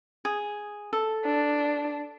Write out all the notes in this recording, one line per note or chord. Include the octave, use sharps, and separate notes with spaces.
G#4
A4
D4